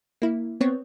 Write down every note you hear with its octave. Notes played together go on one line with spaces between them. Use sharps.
A#3 E4
B3 C4 C#5